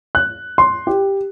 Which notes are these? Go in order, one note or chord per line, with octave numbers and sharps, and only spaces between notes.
F#6
C6
G4